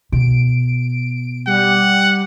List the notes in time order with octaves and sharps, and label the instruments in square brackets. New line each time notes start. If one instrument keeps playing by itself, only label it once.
[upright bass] B2 [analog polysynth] D7
[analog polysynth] G3 G4 [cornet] F#5